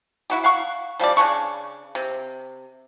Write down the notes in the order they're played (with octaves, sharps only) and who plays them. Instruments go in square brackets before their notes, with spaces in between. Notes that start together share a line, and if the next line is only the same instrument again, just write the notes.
[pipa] E4 F#4 G4
F5 F#5 C#6
F3 G3 D4 D5
C#3 F#3 D4 C#6
C3